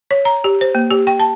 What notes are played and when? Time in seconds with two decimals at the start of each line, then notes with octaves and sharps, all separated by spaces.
0.11 C#5
0.25 A#5
0.44 G4
0.61 C5
0.75 A#3
0.91 G4
1.07 G5
1.19 A5